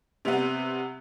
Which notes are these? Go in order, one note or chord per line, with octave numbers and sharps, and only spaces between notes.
C3 G3 B3